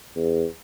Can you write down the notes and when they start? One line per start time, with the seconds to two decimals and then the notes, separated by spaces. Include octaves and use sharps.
0.16 E2